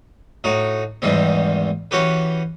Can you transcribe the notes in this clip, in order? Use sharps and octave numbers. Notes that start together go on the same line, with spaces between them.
A2 D#4 F#4
E2 G#2 D#3 E3 G3 C4
E3 C#4 F#4 G4 B4